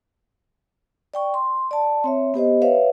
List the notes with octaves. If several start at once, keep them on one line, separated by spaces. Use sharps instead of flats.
D5 G5 C#6
C6
D5 A5
C4 C#5 E5
B3 G4 C5 D#5
B4 C#5 E5 F5